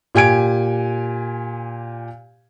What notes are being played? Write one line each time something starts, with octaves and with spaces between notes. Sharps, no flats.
A#2 G4 G#5 G#6 D7